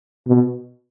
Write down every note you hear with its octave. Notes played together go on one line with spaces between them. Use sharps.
B2